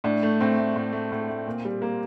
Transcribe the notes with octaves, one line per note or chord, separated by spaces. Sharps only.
A2 D4
A3
A2 C4
A3
A2
A3
A2
A3
A#2
G3
A#3